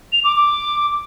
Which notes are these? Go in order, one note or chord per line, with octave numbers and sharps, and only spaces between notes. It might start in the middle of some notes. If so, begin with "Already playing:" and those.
F7
D6
D6